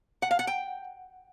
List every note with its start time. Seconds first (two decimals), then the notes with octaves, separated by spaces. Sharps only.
0.22 F#5
0.31 F5
0.39 F#5
0.47 G5